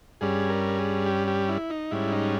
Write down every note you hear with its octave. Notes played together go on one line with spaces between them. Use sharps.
G2 G3 C#4 G#4
A#4
G#4
G4
G4
E4
D#4
G#2 G3 C#4 E4
D#4